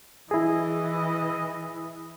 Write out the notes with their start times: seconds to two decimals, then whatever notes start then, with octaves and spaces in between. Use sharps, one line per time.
0.31 E3 E4 G#4 D#5